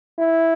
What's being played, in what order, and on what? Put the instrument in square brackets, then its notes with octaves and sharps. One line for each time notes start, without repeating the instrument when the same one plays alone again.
[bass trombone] E4